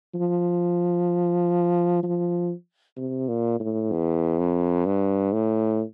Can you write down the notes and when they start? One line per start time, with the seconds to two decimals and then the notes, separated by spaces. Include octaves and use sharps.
0.14 F3
2.03 F3
2.97 C3
3.28 A#2
3.60 A2
3.91 E2
4.39 F2
4.86 G2
5.33 A2